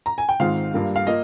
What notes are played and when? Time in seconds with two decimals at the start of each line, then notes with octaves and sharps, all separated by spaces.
0.06 A#5
0.18 G#5
0.29 G5
0.40 G#2 D#3 G#3 C4 F4 F5
0.74 G2 G3 A#3 F4
0.96 F5
1.07 A#3 F4 D#5